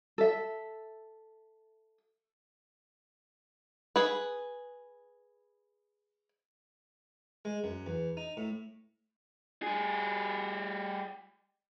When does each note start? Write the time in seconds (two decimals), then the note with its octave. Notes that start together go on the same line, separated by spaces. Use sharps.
0.18 A4 E5
3.96 G#4 B4
7.45 G#3
7.64 F#2
7.86 E2
8.17 D#4
8.37 A2
9.62 G3 G#4